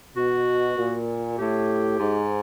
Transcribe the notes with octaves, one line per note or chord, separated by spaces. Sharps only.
B2 F#4
A#2
A2 G4
G#2